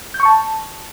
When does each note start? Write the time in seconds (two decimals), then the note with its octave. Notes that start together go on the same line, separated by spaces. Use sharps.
0.14 G6
0.20 C#6
0.25 A5